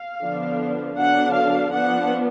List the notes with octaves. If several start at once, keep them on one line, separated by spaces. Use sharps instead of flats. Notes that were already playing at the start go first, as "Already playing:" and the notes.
Already playing: F5
D3 F3 B3 D4
D3 F#3 B3 D4 F#5
F5
F3 B3 D4 F#5